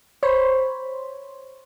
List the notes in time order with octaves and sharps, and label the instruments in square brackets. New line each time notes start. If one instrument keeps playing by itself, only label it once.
[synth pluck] C5 C#5 B5